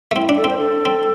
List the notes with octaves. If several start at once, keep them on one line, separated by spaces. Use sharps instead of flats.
A3
C4 E4
D4
A4
C4
C5
A4
C4